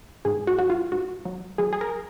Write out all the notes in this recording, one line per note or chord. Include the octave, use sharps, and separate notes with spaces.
G#2 G#4
F#4
F#3 F#4
F4
G#2 F#4
F#3
F#3 G#4
G#4
A#4